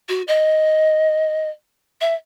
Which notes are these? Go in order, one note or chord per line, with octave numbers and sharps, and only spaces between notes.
F#4
D#5
E5